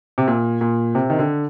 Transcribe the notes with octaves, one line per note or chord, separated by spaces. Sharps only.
C3
A#2
A#2
C3
D#3
D3